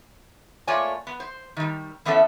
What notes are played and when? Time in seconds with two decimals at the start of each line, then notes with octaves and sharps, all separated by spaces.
0.67 A3 A#3 F4 C#5 D5 G#5
1.07 B3
1.20 C5
1.57 D#3 G3
2.05 E3 B3 C#4 D4 A4 E5